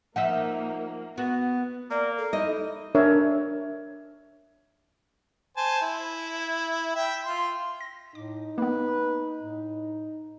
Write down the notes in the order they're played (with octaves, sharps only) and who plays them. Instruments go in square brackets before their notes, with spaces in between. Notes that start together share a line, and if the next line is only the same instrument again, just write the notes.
[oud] F3 D#4 E5 [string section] A#3 [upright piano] F#5
[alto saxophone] B3 [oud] F#4
[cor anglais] A#3 [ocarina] D5
[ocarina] A4
[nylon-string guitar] D#4 D#5 [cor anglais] E4
[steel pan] D4 A#4 C#5 E5
[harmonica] C5 G#5 A5
E4
E5 G5
F4 C6
[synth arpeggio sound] A#6
[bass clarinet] A2 [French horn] D#4 [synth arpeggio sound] D6
[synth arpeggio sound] A#3 B3 [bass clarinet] B4
[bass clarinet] A2